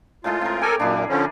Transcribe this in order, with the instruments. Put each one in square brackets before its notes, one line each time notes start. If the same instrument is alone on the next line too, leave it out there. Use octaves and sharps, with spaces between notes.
[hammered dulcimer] A2 G#3 A4 [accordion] F4
[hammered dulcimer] C4 A#4
[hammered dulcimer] G4 C#5 [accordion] A4 A#4 G#5
[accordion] F#2 A#2 A#3 [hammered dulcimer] D4 E4 G#4
[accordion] D3 F3 C#4